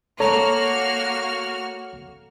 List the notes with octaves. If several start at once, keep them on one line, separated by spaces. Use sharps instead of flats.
A#3 F#4 A4 C#5 A#5 F6